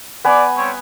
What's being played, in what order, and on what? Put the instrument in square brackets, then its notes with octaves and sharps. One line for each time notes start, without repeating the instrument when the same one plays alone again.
[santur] B3 G#5 [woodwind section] D5
[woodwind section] G3 C4 C#5